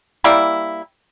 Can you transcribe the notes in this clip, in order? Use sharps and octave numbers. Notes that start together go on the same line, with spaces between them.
G3 A#3 E4